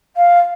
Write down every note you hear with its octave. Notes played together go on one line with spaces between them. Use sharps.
F5